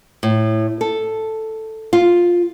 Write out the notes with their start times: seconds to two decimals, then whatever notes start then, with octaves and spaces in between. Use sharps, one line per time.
0.23 A2
0.81 A4
1.93 F4